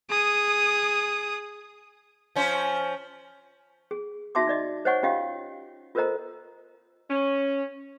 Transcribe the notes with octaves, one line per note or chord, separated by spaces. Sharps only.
G#4 D#6
F3 C#4 C5
G#4
D#4 F#4 E5 A5 C6 D6
D#4 D5 D#5
C5 C#5 D#5 F#5 G#5 C#6
C#4 F4 G4 D#5 F5
F4 A4 A#4 C5 D#5 A#5
C#4